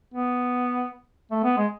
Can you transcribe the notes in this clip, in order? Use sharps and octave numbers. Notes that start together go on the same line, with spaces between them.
B3
A3
B3
G#3